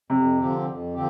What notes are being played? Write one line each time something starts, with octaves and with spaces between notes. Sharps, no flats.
F2 C3
D3 F3 C4 G4
F2
D3 F3 C4 G4